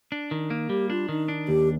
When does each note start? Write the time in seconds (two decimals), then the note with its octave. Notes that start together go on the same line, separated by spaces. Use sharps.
0.12 D4
0.31 D#3
0.50 A#3
0.69 G3 G4
0.90 D4 F4
1.09 D#3 D#4
1.28 D4
1.48 D#2 G4